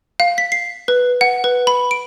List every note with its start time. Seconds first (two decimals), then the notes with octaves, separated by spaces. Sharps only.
0.20 F5
0.38 B6
0.52 C7
0.88 B4
1.21 F#5
1.44 B4
1.67 B5
1.91 D7